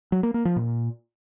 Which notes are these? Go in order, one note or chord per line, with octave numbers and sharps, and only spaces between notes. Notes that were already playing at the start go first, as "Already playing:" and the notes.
F#3
A#3
A#3
F3
A#2